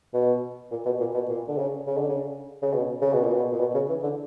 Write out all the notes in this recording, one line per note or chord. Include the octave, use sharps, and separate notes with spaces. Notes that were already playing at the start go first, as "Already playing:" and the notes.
B2
A#2
B2
A#2
B2
A#2
D3
C#3
C#3
D3
C#3
C#3
B2
C#3
B2
A#2
B2
A#2
B2
C#3
E3
D3